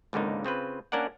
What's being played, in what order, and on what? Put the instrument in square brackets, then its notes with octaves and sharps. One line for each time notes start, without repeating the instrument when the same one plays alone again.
[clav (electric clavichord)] G#1 C#2 D3 A#3 D#4
C#3 C4 F4 B4
A#3 C#4 D4 A#4 D5 F#5